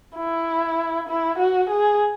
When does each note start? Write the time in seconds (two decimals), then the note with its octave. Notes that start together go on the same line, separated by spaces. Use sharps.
0.17 E4
1.08 E4
1.38 F#4
1.69 G#4